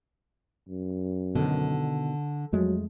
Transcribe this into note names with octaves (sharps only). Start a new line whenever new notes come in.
F#2
B2 D3 D#3
F2 F#3 G#3 A3